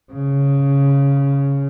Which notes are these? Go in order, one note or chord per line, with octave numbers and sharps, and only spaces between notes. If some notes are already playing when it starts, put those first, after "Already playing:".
C#3